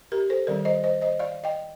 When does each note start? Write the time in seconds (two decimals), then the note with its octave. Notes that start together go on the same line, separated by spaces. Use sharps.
0.12 G4 A#4
0.30 A4 C5
0.47 D#3 G3 C4 A#4 D5
0.65 C5 D#5
0.84 C5 D#5
1.01 C5 D#5
1.19 D5 F5
1.44 D#5 G5